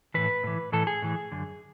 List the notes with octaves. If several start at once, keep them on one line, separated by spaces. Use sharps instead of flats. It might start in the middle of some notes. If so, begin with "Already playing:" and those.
A2 E3 B4
A2 E3
A2 E3 A4
G#4
A2 E3
F#2 D3